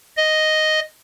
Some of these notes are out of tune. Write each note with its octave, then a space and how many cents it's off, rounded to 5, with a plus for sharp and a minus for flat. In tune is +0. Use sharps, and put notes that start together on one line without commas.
D#5 +0